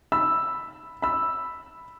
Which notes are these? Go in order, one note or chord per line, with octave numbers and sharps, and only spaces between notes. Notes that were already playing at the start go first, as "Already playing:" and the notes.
B5 E6
B5 E6